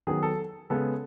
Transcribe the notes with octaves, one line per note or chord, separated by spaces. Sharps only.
D#3 F#3 B3 G#4
A4
C#3 G#3 B3 A4